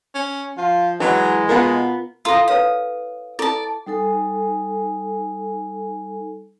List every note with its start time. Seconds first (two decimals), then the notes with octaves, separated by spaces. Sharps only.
0.15 C#4
0.57 F3 F4
1.00 E3 F#3 G#3
1.49 B2 B3 F4 A#4
2.25 E4 F4 A4 D#5
2.48 B4 C#5 F5 D#6
3.39 E4 A4 D5 A5
3.87 G3 D#4 A4 G#5